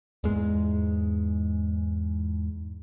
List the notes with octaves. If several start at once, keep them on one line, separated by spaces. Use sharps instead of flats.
E2 G#2 G#3